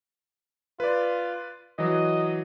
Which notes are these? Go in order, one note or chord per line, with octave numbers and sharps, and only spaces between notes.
F4 B4 D5
E3 F#3 D#5